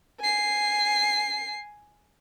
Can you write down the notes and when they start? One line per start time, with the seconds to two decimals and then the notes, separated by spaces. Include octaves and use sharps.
0.21 G#5 C7